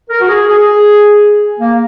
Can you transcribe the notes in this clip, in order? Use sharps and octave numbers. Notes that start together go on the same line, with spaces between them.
A#4
F#4
G#4
G#4
A#3